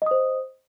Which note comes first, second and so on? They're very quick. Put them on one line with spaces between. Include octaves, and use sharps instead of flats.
D#5 D#6 C5